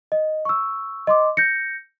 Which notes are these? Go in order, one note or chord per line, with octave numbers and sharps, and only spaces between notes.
D#5
C#6 E6
D#5 C6 D6
G6 A#6 C#7